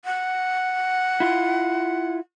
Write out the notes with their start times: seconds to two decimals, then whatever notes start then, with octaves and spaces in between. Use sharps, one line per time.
0.05 F#5
1.20 E4 F4